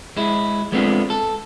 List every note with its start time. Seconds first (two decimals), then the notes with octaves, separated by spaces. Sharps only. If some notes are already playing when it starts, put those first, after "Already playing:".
0.17 G#3 E4
0.72 G#3 A3 B3 C4 D4 F4
1.10 A4